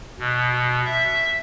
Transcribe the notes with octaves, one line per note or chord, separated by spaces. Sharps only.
B2
E5